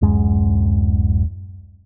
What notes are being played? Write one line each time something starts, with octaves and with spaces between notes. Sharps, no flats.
D1 F#2 G#3